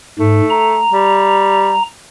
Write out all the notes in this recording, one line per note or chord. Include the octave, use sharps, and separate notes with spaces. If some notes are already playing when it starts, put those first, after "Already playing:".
G#2 A3
A#5
G3